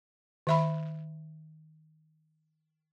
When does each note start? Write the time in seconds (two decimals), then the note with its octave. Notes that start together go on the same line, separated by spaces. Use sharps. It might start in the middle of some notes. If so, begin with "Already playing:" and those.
0.47 D#3 E5 B5